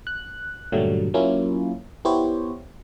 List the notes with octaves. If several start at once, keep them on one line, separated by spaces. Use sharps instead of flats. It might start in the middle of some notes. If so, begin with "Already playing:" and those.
F#6
G2 A#2 D3 F#3 G3 A3
F#3 A#3 C#4 E4 F4
B3 E4 G4 C5 C#5